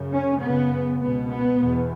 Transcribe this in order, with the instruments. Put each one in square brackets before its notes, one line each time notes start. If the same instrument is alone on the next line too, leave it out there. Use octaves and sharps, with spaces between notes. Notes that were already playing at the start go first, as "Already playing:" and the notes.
Already playing: [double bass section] F#2 C#3
C#4
F#2 C#3 B3
C#2 B2 B3
B3
E2 B2